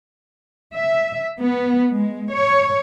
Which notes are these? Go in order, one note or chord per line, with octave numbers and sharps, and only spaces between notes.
E5
B3
G#3
C#5